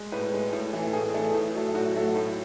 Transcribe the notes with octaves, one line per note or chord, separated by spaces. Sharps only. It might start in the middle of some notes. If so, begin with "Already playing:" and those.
Already playing: G#3
A2 B4
G#3
A2
E3 A3
A2 G#4
E3 A3
A2
F#3 A3
A2 F#4
F#3 A3
A2